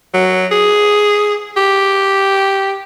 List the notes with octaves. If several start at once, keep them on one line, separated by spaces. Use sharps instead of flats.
F#3
G#4
G4